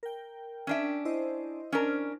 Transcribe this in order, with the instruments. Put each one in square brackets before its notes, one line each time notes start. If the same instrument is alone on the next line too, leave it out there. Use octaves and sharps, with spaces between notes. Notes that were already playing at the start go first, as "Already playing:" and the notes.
[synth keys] A#4 G5
[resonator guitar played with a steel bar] C#4 D4 E5
[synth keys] E4 C5 D#5
[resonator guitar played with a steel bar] C#4 D4 A#4